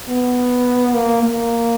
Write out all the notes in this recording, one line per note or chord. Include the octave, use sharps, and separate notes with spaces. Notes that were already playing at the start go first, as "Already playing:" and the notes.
B3
A#3
A#3